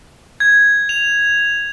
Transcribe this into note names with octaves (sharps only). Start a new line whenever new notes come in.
G#6
F7